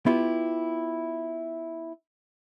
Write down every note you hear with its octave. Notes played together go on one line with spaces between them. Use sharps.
B3 E4 F4 G4